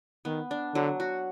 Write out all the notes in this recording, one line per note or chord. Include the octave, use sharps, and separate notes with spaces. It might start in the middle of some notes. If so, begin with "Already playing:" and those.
D#3 B3
D4
D3 F#3
F#4